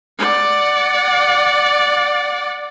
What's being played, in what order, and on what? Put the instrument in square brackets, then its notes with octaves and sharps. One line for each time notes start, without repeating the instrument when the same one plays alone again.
[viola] D5 F#5